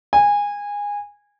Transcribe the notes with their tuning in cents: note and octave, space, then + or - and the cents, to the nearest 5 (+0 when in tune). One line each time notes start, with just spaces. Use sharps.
G#5 -20